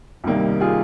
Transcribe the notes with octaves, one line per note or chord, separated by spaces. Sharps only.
C2 C3 D#3 G3 A#3
F4 G#4